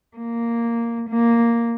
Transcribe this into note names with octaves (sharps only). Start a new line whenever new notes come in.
A#3
A#3